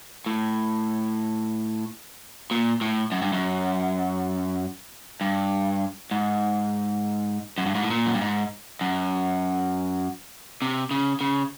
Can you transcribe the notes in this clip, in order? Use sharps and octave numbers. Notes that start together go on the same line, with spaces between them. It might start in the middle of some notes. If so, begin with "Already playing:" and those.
A2
A#2
A2
F#2
G2
F#2
G2
G#2
F#2
G2
G#2
A2
A#2
F#2
G2
G#2
F#2
C3
C#3
C#3